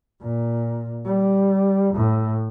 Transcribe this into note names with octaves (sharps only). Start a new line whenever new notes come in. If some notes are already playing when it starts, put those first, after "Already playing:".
A#2
G3
A2